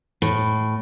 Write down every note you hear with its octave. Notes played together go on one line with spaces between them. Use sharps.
A2